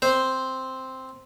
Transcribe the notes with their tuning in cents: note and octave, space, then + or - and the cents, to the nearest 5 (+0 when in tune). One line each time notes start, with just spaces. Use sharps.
C4 +0 C5 +0